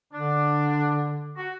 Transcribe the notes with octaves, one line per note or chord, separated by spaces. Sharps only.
D3 D4
F#4